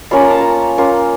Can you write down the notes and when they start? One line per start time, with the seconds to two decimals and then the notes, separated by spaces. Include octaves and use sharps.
0.11 A#3 C#4 F4 B5
0.21 A#5
0.31 A5
0.41 A#5
0.78 A#3 C#4 F4